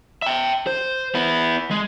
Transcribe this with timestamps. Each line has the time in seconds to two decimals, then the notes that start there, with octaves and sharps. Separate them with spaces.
0.22 E5 G5
0.67 C5
1.15 B3 E4
1.71 G#3